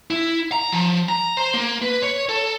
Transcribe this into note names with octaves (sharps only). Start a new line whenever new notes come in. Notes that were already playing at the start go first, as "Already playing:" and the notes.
E4
A#5
F3
A#5
C5
A#3
B4
C#5
A4